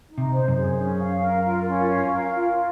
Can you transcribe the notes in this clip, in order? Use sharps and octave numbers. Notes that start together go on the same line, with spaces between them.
D#4
C3
C5
F#2
G#4
C#4
F5
A#4
F4
C#4
F5
A#4
F4